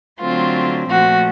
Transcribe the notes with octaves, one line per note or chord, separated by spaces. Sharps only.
D3 F#3 A3 C4 F4
A#2 F3 A3 F#4